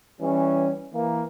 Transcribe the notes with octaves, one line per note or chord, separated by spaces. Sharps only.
E3 G3 C#4
E3 A#3